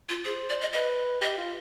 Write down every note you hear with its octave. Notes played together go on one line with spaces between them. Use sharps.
F4
G#4 C5
D5
D#5
B4 D#5
G4 D#5
F4